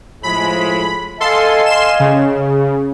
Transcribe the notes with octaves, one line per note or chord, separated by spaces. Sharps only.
A2 F3 G#3 B5
A4 D#5 F5 G#5 C6
C6 E7
C#3